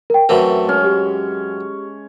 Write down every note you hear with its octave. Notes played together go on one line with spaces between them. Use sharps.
A#4 G5
F#2 E3 A3 C4 A#4 B4
G#3 C#4
G4